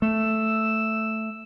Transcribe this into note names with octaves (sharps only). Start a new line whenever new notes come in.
A3 E6